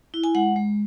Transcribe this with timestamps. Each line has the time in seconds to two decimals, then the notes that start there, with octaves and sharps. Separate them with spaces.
0.14 E4
0.24 G#5
0.35 G#3 F#5
0.56 G#3